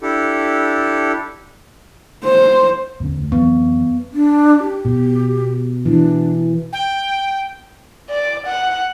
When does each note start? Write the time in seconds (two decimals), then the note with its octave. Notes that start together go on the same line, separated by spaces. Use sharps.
0.02 D4 E4 G4 A4
2.24 C5
3.00 E2 D3 C#4
3.18 D2
3.32 F2 E3 F#3 B3
4.14 D4
4.63 G4
4.85 B2
5.86 E3 D4
6.73 G5
8.10 D5
8.47 F#5